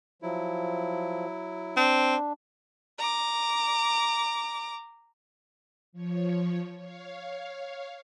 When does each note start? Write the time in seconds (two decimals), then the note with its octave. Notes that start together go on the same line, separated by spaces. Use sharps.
0.22 F3 F#3 E4
1.77 C4 D4
2.99 A#5 D6
5.92 F3 C#5
6.78 C#5 F5